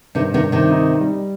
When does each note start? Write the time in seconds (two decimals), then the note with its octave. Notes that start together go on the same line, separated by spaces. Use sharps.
0.15 G2 C3 D#3
0.34 C3 D#3
0.44 G2
0.52 C3 D#3
0.72 D#4
1.01 G3